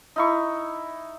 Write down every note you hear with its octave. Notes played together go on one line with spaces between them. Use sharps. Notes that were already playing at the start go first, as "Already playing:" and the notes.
D#4 E4 C#6